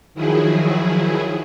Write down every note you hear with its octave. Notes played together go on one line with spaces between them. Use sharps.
D#3 F3 F#3 E4 G#4